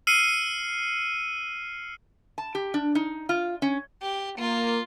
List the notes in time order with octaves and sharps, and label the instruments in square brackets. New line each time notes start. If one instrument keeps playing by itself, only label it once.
[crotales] E6 F6 C7 C#7 D#7
[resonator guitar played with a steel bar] A5
G4
D4
D#4
F4
C#4
[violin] G4
[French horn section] A#3 [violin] F4